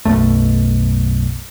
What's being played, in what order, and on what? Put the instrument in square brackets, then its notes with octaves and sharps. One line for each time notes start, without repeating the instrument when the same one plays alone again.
[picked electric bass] B1 F#2 A3